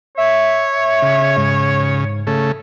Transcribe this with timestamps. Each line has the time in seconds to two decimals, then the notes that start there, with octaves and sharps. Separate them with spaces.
0.18 C#5 E5
1.02 C#3
1.37 G#2
2.27 C#3 A3